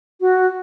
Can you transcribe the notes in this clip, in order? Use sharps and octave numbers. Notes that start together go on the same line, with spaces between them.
F#4